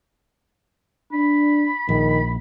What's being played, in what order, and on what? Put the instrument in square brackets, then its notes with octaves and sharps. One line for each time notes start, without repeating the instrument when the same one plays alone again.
[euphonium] D4 [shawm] B5
[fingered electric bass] A#1 [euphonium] D#3